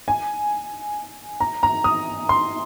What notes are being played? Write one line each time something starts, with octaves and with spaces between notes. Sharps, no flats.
G#5
A#5
A#5
D#6
C6